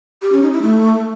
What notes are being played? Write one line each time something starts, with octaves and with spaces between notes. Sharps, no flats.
G4
C#4
D#4
E4
A3